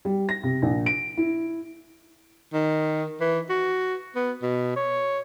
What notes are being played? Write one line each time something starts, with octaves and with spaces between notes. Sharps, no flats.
G3
A#6
C3
A#1
D7
E4
D#3
E3
F#4
B3
B2
C#5